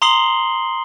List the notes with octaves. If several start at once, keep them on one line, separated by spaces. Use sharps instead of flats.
A#5 C6 D#6 C7 F#7 G7